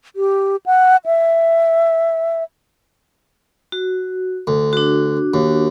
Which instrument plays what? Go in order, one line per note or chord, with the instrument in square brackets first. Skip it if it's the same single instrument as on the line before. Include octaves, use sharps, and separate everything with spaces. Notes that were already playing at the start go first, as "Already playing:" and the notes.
[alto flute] G4
F#5
E5
[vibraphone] F#4
[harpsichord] D2
[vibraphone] D4 F#4
[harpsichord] D#2